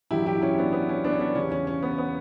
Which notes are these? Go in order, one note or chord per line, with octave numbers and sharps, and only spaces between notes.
A1 G2 F#3 E4 G4
E4 G4
C#4 E4
B3 D4
B3
C#4
B3 D4
C#4
B3 D4
E2 C#3 G3 C#4
C#4
C#4
B3
B3